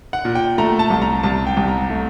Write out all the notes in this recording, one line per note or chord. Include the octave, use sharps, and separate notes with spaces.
F#5
A#2
G5
A3 A#5
A5
C2
A#5
C2 A5
G5
C2
A#5
A3